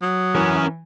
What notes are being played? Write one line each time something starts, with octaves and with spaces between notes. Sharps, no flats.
F#3 D#6
E3 C#4 A#4